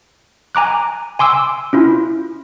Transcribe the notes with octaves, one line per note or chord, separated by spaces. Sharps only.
G#5 A#5 D6 F#6
G#5 C6 D6 E6
C#4 E4 F4